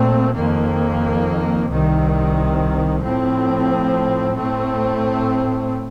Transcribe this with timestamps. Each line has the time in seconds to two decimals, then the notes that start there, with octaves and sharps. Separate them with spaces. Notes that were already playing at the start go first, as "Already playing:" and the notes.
Already playing: A#2 A3 C4
0.35 F2 D#3 A#3
1.70 C2 C3 D#3
3.04 A2 F3 C4
4.39 A2 A3 C4